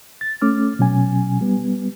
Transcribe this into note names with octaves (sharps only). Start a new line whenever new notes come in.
A6
A3 C#4 D6 F6
B2 F#3 C#4 G#5
G3 B3